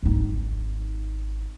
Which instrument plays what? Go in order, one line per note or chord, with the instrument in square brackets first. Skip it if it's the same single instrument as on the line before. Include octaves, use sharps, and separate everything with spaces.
[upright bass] G#1 D#4